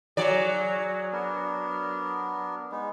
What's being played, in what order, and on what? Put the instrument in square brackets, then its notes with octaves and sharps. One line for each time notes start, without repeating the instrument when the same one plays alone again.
[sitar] F#3 D5 [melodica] G#4
[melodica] B3 D4 A#4
G#3 B3 D#4